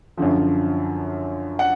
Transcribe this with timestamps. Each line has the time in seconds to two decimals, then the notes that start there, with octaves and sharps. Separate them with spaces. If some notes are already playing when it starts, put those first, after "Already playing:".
0.17 F#2 D3 F3
1.59 F#5